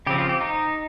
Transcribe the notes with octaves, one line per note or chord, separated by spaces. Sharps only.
C#3 F3 C4 G4
F4
G4
D#4